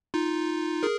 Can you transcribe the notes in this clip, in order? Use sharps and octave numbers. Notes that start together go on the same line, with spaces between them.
D#4 F4
G#4 A#4